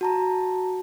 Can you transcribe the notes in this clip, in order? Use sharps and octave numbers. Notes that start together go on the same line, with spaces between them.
F#4 A5 A#5